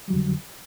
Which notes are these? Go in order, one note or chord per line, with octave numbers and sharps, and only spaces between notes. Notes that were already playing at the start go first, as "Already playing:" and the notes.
F2 D3 F#3 G3